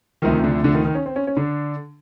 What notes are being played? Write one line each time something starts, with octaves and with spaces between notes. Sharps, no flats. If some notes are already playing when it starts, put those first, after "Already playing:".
D2 C3 D#3 F3 D#4
D3 D4
D3 D4
D#3 D#4
D#3 D#4
C#4
C4
C#4
C#4
D3 D4